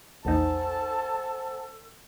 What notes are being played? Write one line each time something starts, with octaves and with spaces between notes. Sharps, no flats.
A#1 E2 D#4 A4 C5 F#5 G#5 A5